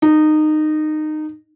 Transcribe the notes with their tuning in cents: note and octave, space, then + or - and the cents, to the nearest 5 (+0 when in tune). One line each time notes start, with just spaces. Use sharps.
D#4 -20